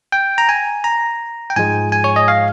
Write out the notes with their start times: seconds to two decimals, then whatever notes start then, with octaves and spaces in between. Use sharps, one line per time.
0.12 G5
0.38 A#5
0.49 G#5
0.84 A#5
1.50 G5
1.56 G#2 F3 G#3 G#5
1.92 G#5
2.04 C#5
2.16 D#5
2.28 F5